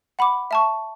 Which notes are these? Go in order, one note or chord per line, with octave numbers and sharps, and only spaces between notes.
F#5 B5 D6
E5 A5 C#6